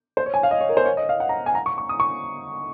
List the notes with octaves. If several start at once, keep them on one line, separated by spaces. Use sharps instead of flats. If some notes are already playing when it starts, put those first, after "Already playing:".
C5
C#5
G#5
F5
D#5
C#5
A#4
C5
C#5
D#5
F5
F#5
A#5
G#5
A#5
C#6
C#6
D#6
C#6